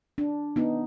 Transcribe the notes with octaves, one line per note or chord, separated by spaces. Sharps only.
D4
B3 D#4